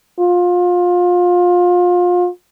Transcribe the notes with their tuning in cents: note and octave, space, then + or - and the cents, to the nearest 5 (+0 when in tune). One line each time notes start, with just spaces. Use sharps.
F4 +25